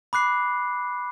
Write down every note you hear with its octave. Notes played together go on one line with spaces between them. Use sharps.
B5 D6 F#6 C7